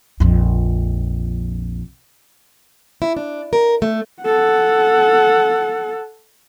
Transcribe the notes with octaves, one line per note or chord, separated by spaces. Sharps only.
A#1 F2
E4
D4
A#4
A3
A4 F#5